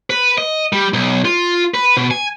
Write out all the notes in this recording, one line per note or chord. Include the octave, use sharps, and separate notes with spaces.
B4
D#5
G3
B1
F4
B4
B2
G#5